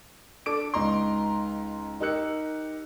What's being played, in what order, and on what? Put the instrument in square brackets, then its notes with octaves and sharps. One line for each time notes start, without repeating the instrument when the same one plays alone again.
[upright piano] D4 A4 D6 D7
C#2 D#4 A#5 C6
D#4 G4 A#4 E6 F#6 C#7